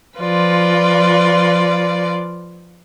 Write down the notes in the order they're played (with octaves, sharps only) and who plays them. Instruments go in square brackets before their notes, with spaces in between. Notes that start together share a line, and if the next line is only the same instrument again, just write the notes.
[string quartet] F3 F4 B4 D5